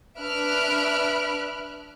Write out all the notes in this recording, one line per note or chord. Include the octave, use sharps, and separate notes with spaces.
D4 B4 E5 F6 F#6 D7